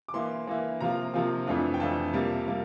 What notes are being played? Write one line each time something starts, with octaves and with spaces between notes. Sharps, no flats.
D6
E3 A#3 E4 C6
E3 A#3 E4
C3 F3 A#3 F4 A#5
C3 F3 A#3 F4
F2 E3 A3 D4 F4
G5
F2 E3 A3 D4 F4 A5
C3 G3 A#3 F4 A5
G3 A#3 F4